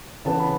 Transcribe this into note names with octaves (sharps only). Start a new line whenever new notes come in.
C#3 E3 B3 A5
B5